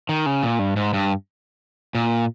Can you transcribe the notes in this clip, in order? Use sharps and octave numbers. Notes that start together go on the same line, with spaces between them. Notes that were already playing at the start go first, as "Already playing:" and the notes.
D#3
C#3
A#2
G2
G#2
G2
A#2